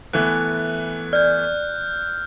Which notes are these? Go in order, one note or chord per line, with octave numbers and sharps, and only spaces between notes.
E3 A3 B3 F#6
D5 F6 G6